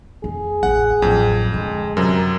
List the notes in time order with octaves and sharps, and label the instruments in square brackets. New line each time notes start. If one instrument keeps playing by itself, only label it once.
[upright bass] F2 [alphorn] G#4
[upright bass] A1 [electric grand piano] F#5
[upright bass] A1 F#3 [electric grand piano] F2
[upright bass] D3 C4 [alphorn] G#3
[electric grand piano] F#2 C3 [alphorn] A#4